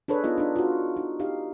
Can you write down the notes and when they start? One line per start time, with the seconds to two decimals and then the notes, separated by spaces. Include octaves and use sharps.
0.08 D4 G#4 A4 B4 C#5
0.24 B3 D#4 F4 D#5
0.38 D4 D#4
0.56 F4 F#4
0.97 D#4
1.20 D#4 G4 F5